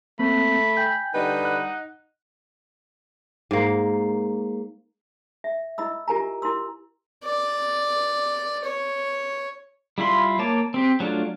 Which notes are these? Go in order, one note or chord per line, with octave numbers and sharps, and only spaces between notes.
A3 A#3 C4 B5
G5 G#5 G6
D3 G3 D#4 B4 F#5
F#6
G#2 A#3
E5
E4 D#5 B5 E6
F4 G4 A#4 G#5 A#5
E4 A#4 C6 E6
D5
C#5
G3 E4 F4 B5 C6
A#3 C#5 A5 D6
C4 G4
F#3 A3 D4 F4